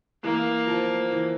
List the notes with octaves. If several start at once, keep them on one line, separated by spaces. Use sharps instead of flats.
E3 A#3
F3
E3